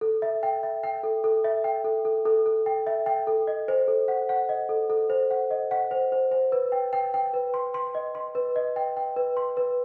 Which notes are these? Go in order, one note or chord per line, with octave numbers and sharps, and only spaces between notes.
A4
E5
G5
E5
G5
A4
A4
E5
G5
A4
A4
A4
A4
G5
E5
G5
A4
D#5
C5
A4
F#5
F#5
D#5
A4
A4
C5
F#5
D#5
F#5
C5
C5
C5
B4
G5
G5
G5
B4
C6
C6
D#5
C6
B4
D#5
G5
G5
B4
C6
B4